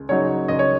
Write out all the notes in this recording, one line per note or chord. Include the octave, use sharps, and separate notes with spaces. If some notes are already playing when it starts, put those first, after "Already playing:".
Already playing: C#2
C#3 F#3 D#4 C#5
C#2 D#5
C#5